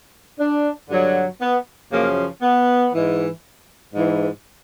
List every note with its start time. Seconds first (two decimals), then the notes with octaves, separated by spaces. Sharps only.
0.40 D4
0.90 G2 D3 F#3
1.41 B3
1.91 F#2 C#3 F3 A#3
2.42 B3
2.92 G#2 E3
3.94 G#2 E3